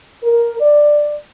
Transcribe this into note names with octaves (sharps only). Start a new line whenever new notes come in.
A#4
D5